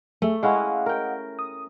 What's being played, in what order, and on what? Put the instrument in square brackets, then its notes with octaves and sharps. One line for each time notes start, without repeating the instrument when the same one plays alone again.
[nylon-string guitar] A3 [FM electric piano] G#4 E5
[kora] G#3 C#4 E4 [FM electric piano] D#5 F5 F#5
[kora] A#4 G5
[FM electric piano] D#6